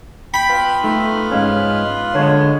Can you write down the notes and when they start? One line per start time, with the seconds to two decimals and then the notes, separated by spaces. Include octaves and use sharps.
0.34 G5 B5
0.49 B3 F4 B4
0.84 A3 D#4
1.32 G#2 G#3 C#4 F5
2.15 D3 G#3 C#5